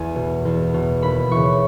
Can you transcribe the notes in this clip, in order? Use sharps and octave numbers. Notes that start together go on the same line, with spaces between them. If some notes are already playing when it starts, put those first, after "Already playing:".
Already playing: E2 G#5
B2
E2
B2
D#2 B5
C#3 E3 C#6